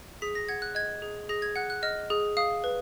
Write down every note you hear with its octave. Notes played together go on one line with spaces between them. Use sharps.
G#4 B6
A#6
F#5 G#6
F#6
D#5 G#6
G#4
G#4 A#6
G#6
F#5 F#6
F#6
D#5 F6
G#4
F5 D#6
B4